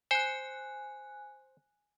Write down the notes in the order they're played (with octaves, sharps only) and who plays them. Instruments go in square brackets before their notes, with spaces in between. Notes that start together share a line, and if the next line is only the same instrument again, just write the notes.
[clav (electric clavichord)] C5 [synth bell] G#5 F#6